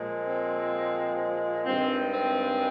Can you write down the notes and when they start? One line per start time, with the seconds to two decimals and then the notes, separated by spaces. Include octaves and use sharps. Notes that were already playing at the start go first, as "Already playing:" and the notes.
Already playing: A#2 F3 G#3
0.26 C4
1.66 G2 D#3 G#3 C4
2.12 C4